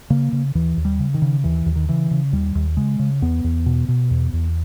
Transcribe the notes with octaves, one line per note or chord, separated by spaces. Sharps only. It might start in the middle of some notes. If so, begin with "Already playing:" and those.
C#3 A#3
C#3
D#2 E3
D#2
G3
C#3
D#3
C#3
D#2 E3
D#2
D#3
C#3 E3
C#3
D#2 G3
D#2
C#3 G#3
C#3
E2 B3
E2
B2
B2
E2
E2